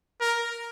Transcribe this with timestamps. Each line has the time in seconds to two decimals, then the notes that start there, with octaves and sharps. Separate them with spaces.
0.21 A#4